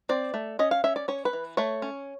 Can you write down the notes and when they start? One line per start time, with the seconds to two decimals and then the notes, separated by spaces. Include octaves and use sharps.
0.09 C4 D5
0.34 A3
0.59 C#4 D#5
0.71 F5
0.84 C#4 E5
0.96 D5
1.08 C#4 C#5
1.25 B4
1.33 E3
1.57 A3 C#5
1.82 C#4